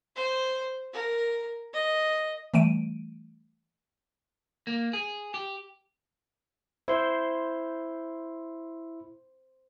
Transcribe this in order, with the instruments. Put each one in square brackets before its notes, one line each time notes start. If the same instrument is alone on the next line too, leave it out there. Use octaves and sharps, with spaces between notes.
[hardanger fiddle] C5
A#4
D#5
[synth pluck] E3 G3 A3 D7 D#7
[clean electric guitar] A#3
G#4
G4
[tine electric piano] E4 C6 [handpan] C5